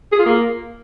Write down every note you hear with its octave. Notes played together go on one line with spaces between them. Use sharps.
G#4
F4
A#3